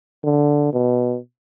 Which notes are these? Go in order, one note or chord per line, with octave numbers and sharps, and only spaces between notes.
D3
B2